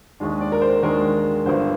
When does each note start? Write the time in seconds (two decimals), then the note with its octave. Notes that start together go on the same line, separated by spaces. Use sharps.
0.20 D#2 D#3 G#3 D4
0.41 D5
0.52 A#4
0.62 C5
0.82 D#2 D#3 G#3 D4 A#4
1.46 G1 G2 D3 C5